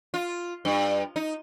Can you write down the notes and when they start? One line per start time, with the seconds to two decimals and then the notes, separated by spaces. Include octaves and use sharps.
0.14 F4
0.65 G2
1.16 D#4